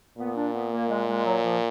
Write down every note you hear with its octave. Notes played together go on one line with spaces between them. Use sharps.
A#2 B3
D4
B3
A#3
G#3
G#3
F#3
F3